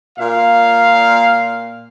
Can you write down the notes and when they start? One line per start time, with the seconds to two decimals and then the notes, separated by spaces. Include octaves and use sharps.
0.19 A#2 F5